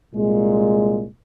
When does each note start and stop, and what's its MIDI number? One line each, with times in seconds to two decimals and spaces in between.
0.15 1.06 36
0.15 1.06 46
0.15 1.06 56